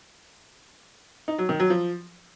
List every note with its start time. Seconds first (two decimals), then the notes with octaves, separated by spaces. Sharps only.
1.28 D#4
1.38 F#3
1.49 D#3
1.60 F#3
1.70 F3